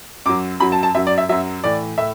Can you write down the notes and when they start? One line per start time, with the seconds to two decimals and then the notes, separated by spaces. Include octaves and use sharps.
0.26 F#2 F#3 D6
0.60 F#2 F#3 B5
0.72 A5
0.83 A5
0.94 F#2 F#3 E5
1.07 D5
1.18 E5
1.29 F#2 F#3 E5
1.64 A2 E3 D5
1.98 A2 E5